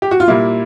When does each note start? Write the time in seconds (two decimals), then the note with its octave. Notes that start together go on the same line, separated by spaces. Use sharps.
0.02 G4
0.11 F#4
0.20 F4
0.28 A#2 G3 A#3 E4